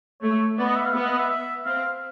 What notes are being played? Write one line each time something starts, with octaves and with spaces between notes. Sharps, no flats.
A3 C#5
B3 D5
D#5
E5
F5
B3 E5
D#5
E5
E5
C4 F5